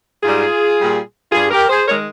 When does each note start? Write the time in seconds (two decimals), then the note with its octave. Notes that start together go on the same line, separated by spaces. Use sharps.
0.23 G#2 G3 F4 G#4
0.78 A#2 G3
1.32 G2 G3 F4 G#4
1.51 G4 A#4
1.69 G#4 C5
1.87 D#3 G#3 A#4 C#5